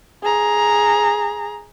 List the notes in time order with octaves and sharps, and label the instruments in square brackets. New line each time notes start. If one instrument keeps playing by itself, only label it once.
[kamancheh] G#4 A#5